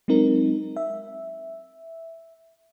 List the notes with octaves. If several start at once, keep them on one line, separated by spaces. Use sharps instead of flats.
F#3 G#3 C4 D#4 A#4
E5